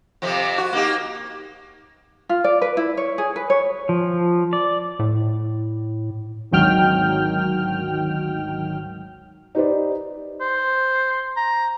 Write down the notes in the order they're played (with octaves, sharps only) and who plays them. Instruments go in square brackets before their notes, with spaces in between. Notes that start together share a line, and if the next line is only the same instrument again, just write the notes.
[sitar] F2 C3 F3
F#4
A#3 D#4 G4
[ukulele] F4
D5
B4
E4
C#5
G#4
B4
C#5
[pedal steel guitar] F3
D5
[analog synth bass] A2
[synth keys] G#1 D2 D#3 F#3 G5 F6
[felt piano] D#4 G4 B4 C5 D5
[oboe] C5
A#5